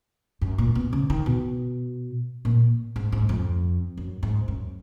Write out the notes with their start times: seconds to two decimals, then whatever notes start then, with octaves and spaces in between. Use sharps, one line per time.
0.41 F#2
0.58 A#2
0.75 B2
0.93 C#3
1.10 D#3
1.26 B2
2.45 A#2
2.96 G#2
3.12 G#2
3.29 F2
3.97 F#2
4.23 G#2
4.48 F#2